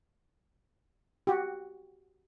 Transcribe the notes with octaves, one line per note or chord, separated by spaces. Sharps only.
F#4 G4